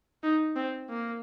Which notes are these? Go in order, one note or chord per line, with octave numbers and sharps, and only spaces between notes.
D#4
C4
A#3